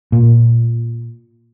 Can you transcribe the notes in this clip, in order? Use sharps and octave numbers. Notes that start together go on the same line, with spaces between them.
A#2